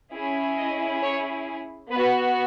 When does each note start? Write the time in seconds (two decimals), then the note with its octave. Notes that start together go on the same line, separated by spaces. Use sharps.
0.13 C#4 E4 G#4
0.57 D#5
1.02 C#5
1.90 B3 F#4 B4